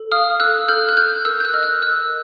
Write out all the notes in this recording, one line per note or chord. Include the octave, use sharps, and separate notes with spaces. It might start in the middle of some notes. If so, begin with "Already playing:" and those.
Already playing: A4
F5 D#6 F6
A4 E6 F#6
A4 F6 G6
F#6
A4 F6 G6
A#4 E6 F#6
G6
E6 F#6
D#5 F6
E6 F#6
A#4 E6 F#6